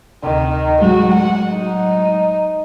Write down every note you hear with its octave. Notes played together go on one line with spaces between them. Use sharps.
D2 C3 D#3
A2 F#3 G#3 F#4
F#5
D#4